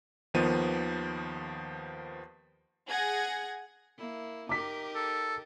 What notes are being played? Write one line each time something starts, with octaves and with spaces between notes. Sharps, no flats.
D#2 D#3 F3 B3 D#7
G#4 F#5 G#6 A#6
A#3 E4
D#4 G4 A#4 D6 B6
A4